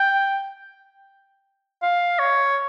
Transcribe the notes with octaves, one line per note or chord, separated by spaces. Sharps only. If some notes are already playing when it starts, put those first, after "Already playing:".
Already playing: G5
F5
C#5